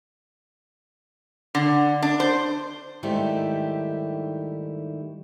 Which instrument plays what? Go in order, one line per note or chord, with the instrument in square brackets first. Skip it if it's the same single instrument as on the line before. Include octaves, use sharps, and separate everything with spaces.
[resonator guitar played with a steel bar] D3
D4
C5
[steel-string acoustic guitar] G#2 D#3 G3 A3 E4 G4